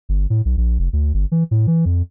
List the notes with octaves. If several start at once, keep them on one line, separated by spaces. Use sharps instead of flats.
G1
A2
B1
A#1
F1
D2
G1
E3
A2
E3
F2